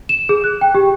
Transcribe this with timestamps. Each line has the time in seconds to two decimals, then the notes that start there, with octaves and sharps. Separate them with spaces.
0.09 E7
0.29 G#4
0.44 F#6
0.61 G5
0.75 G4